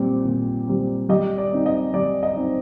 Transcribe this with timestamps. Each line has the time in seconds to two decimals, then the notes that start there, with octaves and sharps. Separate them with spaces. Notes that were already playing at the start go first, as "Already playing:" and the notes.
Already playing: A#2 G3 C4
0.25 A#2
0.67 G3 C4
1.09 G3 D#5
1.38 D5
1.52 C4 D#4
1.66 D#5
1.94 G3 D5
2.23 D#5
2.36 C4 D#4